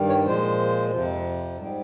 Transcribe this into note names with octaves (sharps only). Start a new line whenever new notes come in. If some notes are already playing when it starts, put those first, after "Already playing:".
Already playing: G2 D#3 G3
C#5
A#2 F3 G#3 C5
F2 C3 F3
G#2 G3